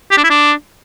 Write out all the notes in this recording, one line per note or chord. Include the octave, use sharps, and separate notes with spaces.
G4
D4
E4
D4